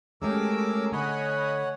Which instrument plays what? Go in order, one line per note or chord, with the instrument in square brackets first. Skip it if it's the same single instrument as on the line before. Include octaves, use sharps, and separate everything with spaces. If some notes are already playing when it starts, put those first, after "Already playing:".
[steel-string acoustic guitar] G#3 A3 G4 [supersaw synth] C#4 G#4 [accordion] A#4 D6 E6
[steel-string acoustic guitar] D3 [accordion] C#5 F#5 [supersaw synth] D#5 G#5 B5